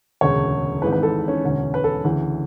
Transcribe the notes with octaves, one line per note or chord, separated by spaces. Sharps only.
E1 D2 C#3 C#5
G#1 G#2 E3 B4
B4
A4
C#4
E1 D2 D3
B4
A4
D2 C#3 E3